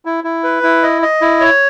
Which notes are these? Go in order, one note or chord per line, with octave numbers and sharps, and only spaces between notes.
E4
E4
B4
E4
D#5
D#5
E4
C#5